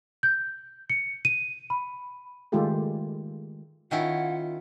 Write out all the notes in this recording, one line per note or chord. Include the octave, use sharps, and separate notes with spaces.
G6
C#7
D#7
B5
D#3 G#3 A3 F4 G4 A4
D#3 C#4 E4 F4 F#5